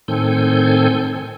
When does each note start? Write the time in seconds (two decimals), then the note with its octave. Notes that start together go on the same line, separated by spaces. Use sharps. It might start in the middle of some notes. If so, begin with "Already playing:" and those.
0.08 A2 D#3 C4 A4 G#5 G6